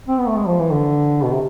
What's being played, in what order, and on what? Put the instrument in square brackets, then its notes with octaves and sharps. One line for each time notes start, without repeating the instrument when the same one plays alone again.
[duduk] C4
B3
A3
G#3
F3
E3
D3
B2
C3